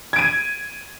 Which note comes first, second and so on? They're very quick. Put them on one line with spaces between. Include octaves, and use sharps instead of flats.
G#6 D7 D#7